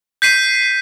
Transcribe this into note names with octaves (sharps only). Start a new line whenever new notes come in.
G6 B6 C7 D#7